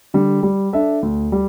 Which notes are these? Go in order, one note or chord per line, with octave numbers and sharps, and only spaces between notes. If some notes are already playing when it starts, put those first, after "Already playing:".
D3 G3
G3
D4 A4 E5
D2
G3